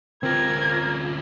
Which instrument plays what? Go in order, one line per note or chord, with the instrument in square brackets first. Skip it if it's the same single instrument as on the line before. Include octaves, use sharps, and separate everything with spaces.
[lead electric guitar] D2 F4 [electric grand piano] C4 [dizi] A#4 [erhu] G#6